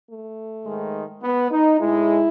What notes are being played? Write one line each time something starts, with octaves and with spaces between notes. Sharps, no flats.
A3
G#2 D#3 G#3
B3
D#4
A2 G#3 E4